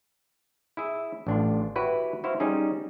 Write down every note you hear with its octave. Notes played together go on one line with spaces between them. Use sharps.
E4 G#4 E5
A1 D4 F4
E4 F#4 G4 B4 C#5
E4 F#4 C5 E5 F5
G3 C#4 D#4 G#4